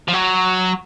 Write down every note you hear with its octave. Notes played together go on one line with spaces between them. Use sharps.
F3
F#3